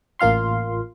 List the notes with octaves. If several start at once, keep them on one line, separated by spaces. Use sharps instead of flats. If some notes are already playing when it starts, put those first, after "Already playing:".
A1 A#3 F4 F5 C6